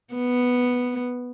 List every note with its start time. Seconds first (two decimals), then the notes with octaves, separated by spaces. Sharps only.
0.14 B3